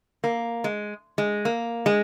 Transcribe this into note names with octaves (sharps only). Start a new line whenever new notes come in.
A#3
G#3
G#3
A#3
G#3